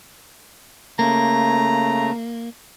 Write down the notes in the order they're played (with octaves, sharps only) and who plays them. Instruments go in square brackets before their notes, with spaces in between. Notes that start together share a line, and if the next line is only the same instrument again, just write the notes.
[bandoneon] C#3 A3 [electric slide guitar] A#3 [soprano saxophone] A#5